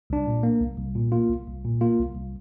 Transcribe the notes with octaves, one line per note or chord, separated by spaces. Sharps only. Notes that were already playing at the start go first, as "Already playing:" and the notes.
C2 D4
A#2
A#3
C2
C2
A#2
A#3 F4
C2
C2
A#2
A#3 F4
C2
C2